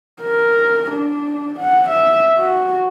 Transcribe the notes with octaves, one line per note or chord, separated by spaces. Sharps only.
A#4
D4
F#5
E5
F#4